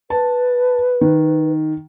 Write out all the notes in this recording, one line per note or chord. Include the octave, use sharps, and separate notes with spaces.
B4 A5
D#3